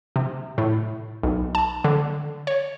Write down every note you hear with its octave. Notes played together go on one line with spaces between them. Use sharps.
C3
A2
B1
A5
D3
C#5